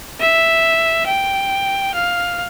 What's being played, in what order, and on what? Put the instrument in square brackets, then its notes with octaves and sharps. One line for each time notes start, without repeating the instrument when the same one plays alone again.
[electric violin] E5
G5
F5